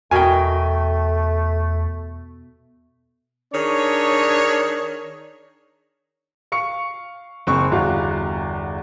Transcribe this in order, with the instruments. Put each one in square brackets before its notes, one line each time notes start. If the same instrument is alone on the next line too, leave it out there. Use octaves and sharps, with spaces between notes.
[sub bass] E2 [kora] B2 A#4 [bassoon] A3 [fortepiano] G5 G#5
[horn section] D#3 D4 G#4 C#5
[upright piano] F5 C#6 C#7
F#1 C4 C#6
G1 E2 F#4 G4 F5